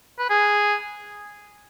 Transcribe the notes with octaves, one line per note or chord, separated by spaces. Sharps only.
B4
G#4